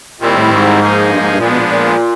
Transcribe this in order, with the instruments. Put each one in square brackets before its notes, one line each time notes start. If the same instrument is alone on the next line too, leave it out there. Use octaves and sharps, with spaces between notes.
[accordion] A#2 [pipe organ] D#3 G3 C4 E4
[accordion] A2
G#2
[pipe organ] F3 A#3 D#4 G#4
[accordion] G2
G#2
G2
[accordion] A#2 [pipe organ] F3 G#3 B3 D4
[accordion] B2
A#2
A#2